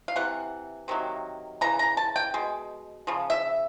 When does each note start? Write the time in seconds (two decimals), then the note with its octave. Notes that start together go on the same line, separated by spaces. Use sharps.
0.08 F5
0.16 C3 E3 F#5
0.88 C3 D#3 F#3 A#3
1.61 C#3 E3 A#5
1.79 A#5
1.97 A5
2.16 G5
2.34 B2 G#3
3.07 C#3 F3
3.30 E5